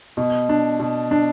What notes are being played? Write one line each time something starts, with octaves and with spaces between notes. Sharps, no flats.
B2
D4
B2
D4